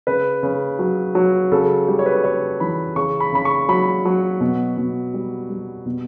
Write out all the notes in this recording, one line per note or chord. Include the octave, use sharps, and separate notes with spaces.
C#3 B4
C#3
F#3
F#3
C#3 A4
G3 G4
C#5
B4
C#3 C#5
E3 B5
C#3 C#6
B5
C#3 B5
C#6
F#3 B5
F#3
B2
B2
G3
G3
B2